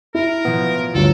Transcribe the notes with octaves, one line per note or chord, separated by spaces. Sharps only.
E4 A#4
A1 B2 F3 B3
D2 G2 D3 F#3 F4 A4